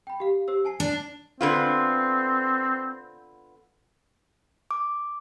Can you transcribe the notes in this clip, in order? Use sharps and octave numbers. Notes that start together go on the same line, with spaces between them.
G5 B5
G4 F5
G4 C5 E6
G#5 A5 C7
D4
D3 B3 C4 F4
D6